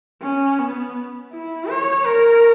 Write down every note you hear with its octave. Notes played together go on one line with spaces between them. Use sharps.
C#4
B3
E4
C#5
A#4